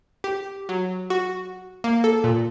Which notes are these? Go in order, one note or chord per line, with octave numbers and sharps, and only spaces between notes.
G4
F#3
F#4
A#3
A4
A#2